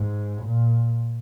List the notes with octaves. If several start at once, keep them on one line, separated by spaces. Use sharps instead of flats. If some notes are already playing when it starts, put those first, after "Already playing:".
Already playing: G#2
A#2